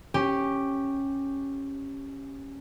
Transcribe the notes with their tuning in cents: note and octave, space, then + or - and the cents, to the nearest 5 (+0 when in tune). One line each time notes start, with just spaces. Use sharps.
C#4 -10 G4 +0